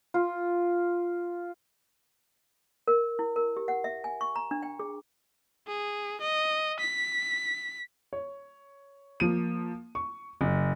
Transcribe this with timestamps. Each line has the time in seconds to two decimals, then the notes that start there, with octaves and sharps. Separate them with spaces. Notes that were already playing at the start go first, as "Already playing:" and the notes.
0.14 F4
2.88 A#4
3.19 E4
3.36 A#4
3.57 G4
3.68 F#5
3.84 E5
4.04 G#5
4.21 C#6
4.36 A#5
4.51 D4
4.63 G5
4.80 G#4
5.67 G#4
6.21 D#5
6.80 B6
8.13 C#5
9.20 F3 A#3 D#7
9.95 C#6
10.41 F#1